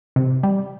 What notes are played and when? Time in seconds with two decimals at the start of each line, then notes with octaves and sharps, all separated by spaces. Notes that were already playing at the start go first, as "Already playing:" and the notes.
0.16 C3
0.43 G3